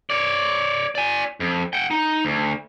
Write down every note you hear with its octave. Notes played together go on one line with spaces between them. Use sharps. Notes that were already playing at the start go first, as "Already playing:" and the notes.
C#5 D5
D5 G#5
F2
F#5 G5
D#4
D2